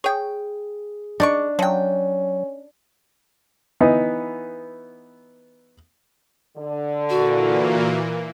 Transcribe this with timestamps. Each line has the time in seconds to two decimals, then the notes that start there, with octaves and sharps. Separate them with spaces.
0.04 G#4 C#5 G5
1.20 D4 D#4 D5 C#6
1.59 F3 F#3 C#4 G5
3.81 E3 B3 D#4
6.57 D3
7.10 A#2 E3 A#3 F#4